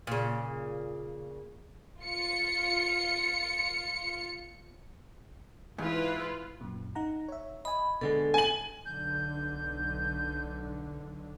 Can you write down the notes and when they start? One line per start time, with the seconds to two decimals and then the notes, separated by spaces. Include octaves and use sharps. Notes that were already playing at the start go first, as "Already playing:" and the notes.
0.07 A#2 C#3
2.00 F4 C#7
5.78 G#2 E3 E4 F4 B4
6.61 F#2 A#2
6.95 D#4 F#5 A#5
7.29 C#5 E5
7.65 D#5 G#5 B5
8.01 B2 D3 G#3 A4
8.34 G#5 F#7
8.85 B1 D3 G6